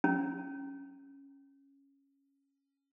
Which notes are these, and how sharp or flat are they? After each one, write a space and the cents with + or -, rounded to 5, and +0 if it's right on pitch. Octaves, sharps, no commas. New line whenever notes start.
C#4 -5